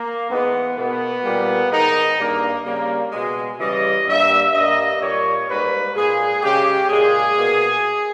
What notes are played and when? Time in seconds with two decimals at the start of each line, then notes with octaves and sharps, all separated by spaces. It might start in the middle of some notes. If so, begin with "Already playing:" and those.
Already playing: A#3
0.29 G#2 E3 G#3 B3
0.77 B2 A#3 B3
1.24 A#2 G3 A#3
1.71 G#2 D#3 G#3 D#4
2.18 G2 G3 A#3
2.65 C#3 G3 A#3
3.12 B2 G#3
3.60 C#3 E3 G3 D#5
4.07 G2 G3 A#3 E5
4.53 G2 G3 A#3 D#5
5.00 A#2 G3 A#3 C#5
5.48 G#2 G3 A#3 B4
5.95 A#2 G#3 G#4
6.42 C#3 G#3 G4
6.90 A#2 G#3 G#4
7.37 B2 A#3